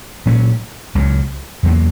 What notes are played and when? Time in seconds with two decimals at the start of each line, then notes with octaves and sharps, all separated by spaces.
0.26 A#2 F#3 C#4
0.95 C#2 C#3 F#3
1.63 E2 D3 F#3 A#3